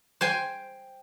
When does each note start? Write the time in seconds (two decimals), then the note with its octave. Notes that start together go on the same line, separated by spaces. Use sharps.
0.21 C5 G5 G#5